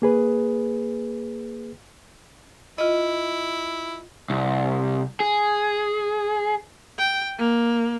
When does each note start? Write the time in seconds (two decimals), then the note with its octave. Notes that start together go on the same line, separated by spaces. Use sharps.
0.02 A#3 G#4 B4
2.78 E4 F4 D#5
4.30 C2
5.20 G#4
6.99 G5
7.38 A#3